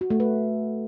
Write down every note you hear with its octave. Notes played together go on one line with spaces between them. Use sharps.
F#4
A3
B4